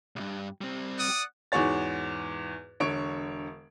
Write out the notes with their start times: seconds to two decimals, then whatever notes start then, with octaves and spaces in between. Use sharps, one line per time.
0.16 C2 G2
0.61 G3 C4
0.98 D5 F#5 D#6
1.52 E2 G#2 F#4 G#4 C#5 A6
2.80 E1 D3 C#5 C#6 D7